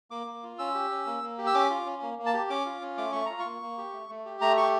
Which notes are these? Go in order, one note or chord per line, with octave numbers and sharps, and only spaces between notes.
A#3 D6
A#3
F4
C#4 E6
G4
C#4
A#3
A#3
G4
E6
C#4 D6
F4
C#4
A#3
A#3
A5
G4
C#4 D6
F4
C#4
A3 D6
A3 C#6
F4 A#5
C#6
A#3
A#3
G4
A3
A3
G4
A3 A#5
G4 C#6